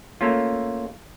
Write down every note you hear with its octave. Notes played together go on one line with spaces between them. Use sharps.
A3 A#3 C#4 F4